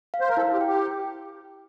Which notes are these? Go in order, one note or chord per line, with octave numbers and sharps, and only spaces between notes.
F5
C5
A#4
E4 A4
G4
G5
G4